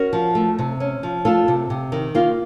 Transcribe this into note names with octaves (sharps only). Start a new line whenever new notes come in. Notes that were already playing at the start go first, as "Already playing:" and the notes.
Already playing: C#4 F#4 A#4
F3
A3
C3
C#4
F3
A3 F4 A4
C3
C3
D#3
A#3 F4